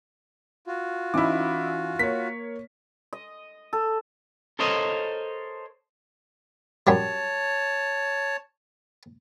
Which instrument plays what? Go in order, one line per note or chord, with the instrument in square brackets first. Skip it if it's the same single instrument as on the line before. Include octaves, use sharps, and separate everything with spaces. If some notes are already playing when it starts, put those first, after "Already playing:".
[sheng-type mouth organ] F4 F#4
[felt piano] E3 C#4 D#4 [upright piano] E4 D6
[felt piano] A#3 C#5 [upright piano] B6
[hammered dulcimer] D#5
A4
[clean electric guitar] A4 A#4 C5 C#5 D#5
[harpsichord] F#2 F#3 G3 [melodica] C#5 A5